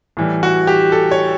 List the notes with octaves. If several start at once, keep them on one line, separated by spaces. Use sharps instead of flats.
A2 E3 G3
F#4
G4
A4
C#5